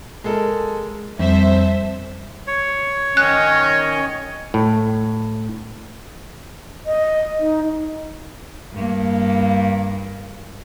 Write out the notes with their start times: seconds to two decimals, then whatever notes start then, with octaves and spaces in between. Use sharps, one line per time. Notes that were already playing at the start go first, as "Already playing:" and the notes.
0.24 G#3 A4 A#4
1.19 F2 G3 C4 A4 C5 E5
2.47 C#5
3.17 D#3 C#4 D#5 G#5 F#6
4.54 A2
6.86 D#5
7.40 D#4
8.74 G2 A#3